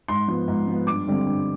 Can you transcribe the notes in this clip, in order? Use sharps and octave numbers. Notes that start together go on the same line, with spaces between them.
G#2 C6
F3 B3
G#2
F3 B3
G2 D6
D3 G3 C4
G2